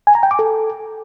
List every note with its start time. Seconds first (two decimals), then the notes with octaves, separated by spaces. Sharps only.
0.07 G#5
0.15 A#5
0.23 G5
0.31 D6
0.39 A4